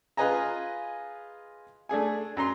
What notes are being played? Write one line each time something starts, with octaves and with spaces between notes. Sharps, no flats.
F4 G#4 B4 D#5 G#5 A#5
A3 D4 G#4 G#5
F#2 A#5 C6